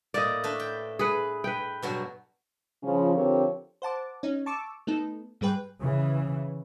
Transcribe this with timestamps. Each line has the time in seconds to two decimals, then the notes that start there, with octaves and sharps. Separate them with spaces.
0.14 A2 A#3 E4 D5 D#5
0.44 A3 D4 B4
0.60 G5
0.99 G#4 B4 B5
1.44 B4 G5
1.82 G2 B2 F#3
2.83 C#3 F3 C#4
3.14 D3 F3 C4 G4 A#4 C#5
3.82 C5 F#5 A5 D6
4.23 C#4 D#4
4.46 A5 C#6 D6 E6
4.87 A3 B3 D#4 A4
5.41 G#2 G3 G#4 B4 G5 F#6
5.81 C#3 E3